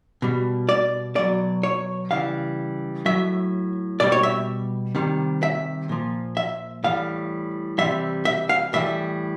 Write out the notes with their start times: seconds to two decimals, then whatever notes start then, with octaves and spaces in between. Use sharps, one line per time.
0.22 B2 G3
0.69 D5
1.16 B2 F#3 D5
1.63 C#5
2.11 C#3 E3 G3 F5
3.06 A2 F#3 E5
4.00 B2 G3 D5
4.12 C#5
4.23 E5
4.95 C3 D#3 G3
5.43 E5
5.89 A#2 F3
6.37 E5
6.84 A2 E3 G3 F5
7.78 C3 E3 G3 E5
8.25 E5
8.49 F5
8.73 A2 E3 G3 E5